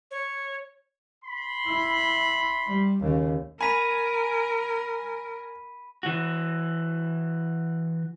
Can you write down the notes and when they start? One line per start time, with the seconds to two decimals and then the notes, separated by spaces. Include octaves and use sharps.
0.11 C#5
1.24 B5 C6
1.66 E4
2.68 G3
3.00 D#2 C#3
3.61 A#4 G#5 A#5 B5 B6 D#7
6.03 E3 F#4